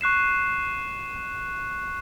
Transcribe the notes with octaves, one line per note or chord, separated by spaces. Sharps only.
C#6 F#6 C7 E7